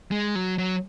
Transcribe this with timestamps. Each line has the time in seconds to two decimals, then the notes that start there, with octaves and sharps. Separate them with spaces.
0.11 G#3
0.35 F#3
0.58 F#3